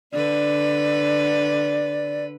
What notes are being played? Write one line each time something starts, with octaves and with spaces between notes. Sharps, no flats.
D3 B4 D5